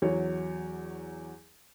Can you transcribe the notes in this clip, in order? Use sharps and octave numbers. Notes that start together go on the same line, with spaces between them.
E2 F#3 C#5